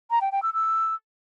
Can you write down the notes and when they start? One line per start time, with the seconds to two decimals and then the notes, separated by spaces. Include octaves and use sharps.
0.11 A#5
0.21 G5
0.32 G5
0.43 E6
0.53 E6